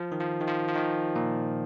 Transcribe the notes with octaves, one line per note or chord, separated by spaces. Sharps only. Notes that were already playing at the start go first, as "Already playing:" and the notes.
Already playing: F3
D#3
F3
D#3
F3
F3
D#3
A#2